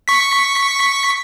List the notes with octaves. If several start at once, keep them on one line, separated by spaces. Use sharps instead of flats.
C#6 B6